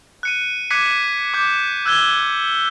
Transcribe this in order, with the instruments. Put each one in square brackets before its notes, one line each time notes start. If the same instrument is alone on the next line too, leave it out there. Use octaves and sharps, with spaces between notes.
[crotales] F#6 C#7 D#7
D6 F#6 G#6 B6 C#7 D#7
D6 G6
E6 F#6 G#6 G7